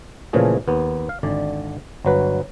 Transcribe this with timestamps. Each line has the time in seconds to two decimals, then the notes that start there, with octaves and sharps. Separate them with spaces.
0.33 A#2 C#3 E3 F3 A3 G#4
0.68 D#2 B3
1.09 F5
1.23 G#1 D3 D5
2.05 G1 F#3 B4